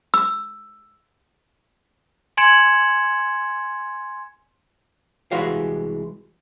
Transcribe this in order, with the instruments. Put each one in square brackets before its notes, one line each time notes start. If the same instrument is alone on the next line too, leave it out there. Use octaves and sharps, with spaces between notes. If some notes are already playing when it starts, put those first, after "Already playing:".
[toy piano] E6
[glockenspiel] G#5 C6 G#6 C#7 E7 F#7
[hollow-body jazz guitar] C2 E3 G#3 F#4 F5